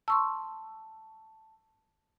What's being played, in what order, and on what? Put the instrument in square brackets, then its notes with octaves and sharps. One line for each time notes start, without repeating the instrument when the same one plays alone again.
[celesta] A5 [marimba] C6 C#6 E6